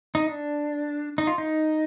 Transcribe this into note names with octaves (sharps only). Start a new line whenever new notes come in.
D#4
D4
D#4
F4
D#4